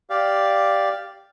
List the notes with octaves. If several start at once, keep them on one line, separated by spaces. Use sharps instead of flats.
G4 D5 F5